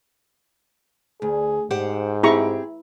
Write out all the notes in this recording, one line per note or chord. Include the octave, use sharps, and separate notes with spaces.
D2 G#4
G#2 G4 C5 F#5
C4 E4 G4 G#4 A#5 C#6